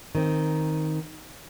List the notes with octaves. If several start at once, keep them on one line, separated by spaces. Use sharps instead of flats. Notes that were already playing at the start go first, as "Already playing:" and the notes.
D#3 C4